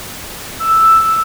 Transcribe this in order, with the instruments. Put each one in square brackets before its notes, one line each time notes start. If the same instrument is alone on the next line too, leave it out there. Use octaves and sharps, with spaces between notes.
[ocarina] E6